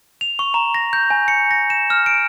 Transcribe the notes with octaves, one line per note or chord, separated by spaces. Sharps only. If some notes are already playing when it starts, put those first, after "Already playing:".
F7
C#6
A#5
A#6
G6
G#5
C#7
A#6
E7
F6
D7